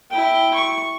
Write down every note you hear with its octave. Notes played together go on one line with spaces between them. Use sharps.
E4 G5
C#6